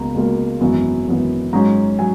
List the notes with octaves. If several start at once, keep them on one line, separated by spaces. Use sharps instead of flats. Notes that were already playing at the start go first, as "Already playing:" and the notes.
Already playing: C#2 B2 A#3 A#5
C#2 B2 A#3
G#1 F#2 E3 B3
G#1 F#2 E3 B3
G#2 F#3 C#4 A#5
F#3 G#5